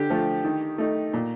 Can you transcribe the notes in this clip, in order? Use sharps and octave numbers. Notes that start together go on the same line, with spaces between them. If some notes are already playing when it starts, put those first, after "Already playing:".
Already playing: D3 G4
F3 A3
D#3
A3 D#4
A#2